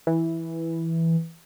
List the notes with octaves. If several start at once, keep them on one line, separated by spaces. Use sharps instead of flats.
E3